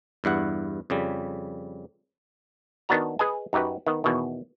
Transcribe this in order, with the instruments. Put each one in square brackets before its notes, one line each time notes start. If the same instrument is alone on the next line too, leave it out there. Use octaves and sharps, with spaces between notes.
[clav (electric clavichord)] E2 G2 E4 F#5
F2 C#3 G3
D#3 B3 D4 F#4 A#5
G#4 B4 D#5 G#5
F#2 D#4 F#4 G4 B4
D#3 B3
E2 B2 D#3